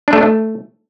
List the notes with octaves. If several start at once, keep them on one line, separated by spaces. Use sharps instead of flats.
D4
A3
D4
A3